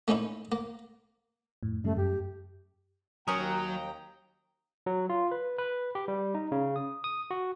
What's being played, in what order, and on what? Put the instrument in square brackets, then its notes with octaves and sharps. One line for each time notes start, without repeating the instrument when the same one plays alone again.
[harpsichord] A3 A#3 C#4 D#4 E4
A#3
[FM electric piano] F2 A2
[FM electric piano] F#2 C#3 G3 [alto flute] A3
[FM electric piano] F#2 [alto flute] G4
[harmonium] D#2 G5 A#5 [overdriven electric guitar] F#3 [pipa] C#4 A#4 [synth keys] D#6
[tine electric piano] F#3
F4
B4
B4
G4
G3
D#4
C#3
D#6
D#6
F#4